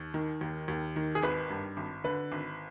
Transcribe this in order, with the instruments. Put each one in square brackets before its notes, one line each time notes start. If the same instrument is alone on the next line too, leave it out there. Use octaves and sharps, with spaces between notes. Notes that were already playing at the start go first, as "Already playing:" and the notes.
Already playing: [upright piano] D#2
D#3
D#2
D#2
D#3
G#4
G#1 B4
G2
G#1
D3 B4
G#1